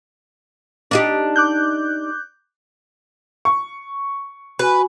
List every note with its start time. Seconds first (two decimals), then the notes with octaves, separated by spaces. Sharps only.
0.91 D4 D#4 G4
1.36 D6 F#6 G6
3.45 C#6
4.59 F#4 B4 G#5